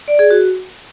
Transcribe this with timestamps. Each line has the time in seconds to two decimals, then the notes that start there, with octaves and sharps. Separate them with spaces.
0.08 D5
0.19 G#4
0.31 F#4